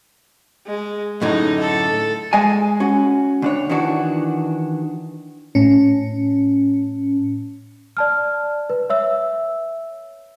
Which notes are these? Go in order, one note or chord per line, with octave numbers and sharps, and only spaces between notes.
G#3
F#2 A2 D3 D#4
A4
G#3 D#5 G#5
C#4 F#4
D2 D4 C#5
D#3 E3 D4 F#4
A2 C#4
D5 A5 F6
B4
C#5 E5 E6